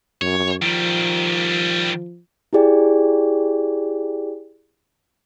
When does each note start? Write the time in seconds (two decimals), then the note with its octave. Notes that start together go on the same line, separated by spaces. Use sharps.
0.21 F#2 C#5
0.62 D#3 F3 G3
2.53 E4 G4 G#4 D5 G5